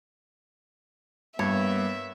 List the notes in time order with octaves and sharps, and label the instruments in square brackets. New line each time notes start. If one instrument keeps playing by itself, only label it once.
[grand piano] G2 [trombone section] A#3 B3 [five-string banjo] C#5 [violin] E5